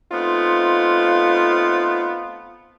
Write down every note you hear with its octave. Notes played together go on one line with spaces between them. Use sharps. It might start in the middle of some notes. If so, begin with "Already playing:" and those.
A3 B3 C4 D#4 F4